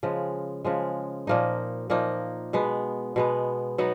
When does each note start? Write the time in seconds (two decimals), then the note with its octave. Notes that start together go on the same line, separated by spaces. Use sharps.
0.03 C#3 F3 G#3
0.65 C#3 F3 G#3
1.27 A#2 F3 A#3 D#4
1.90 A#2 F3 A#3 D#4
2.53 B2 G#3 B3
3.16 B2 G#3 B3
3.78 F#3 B3 D#4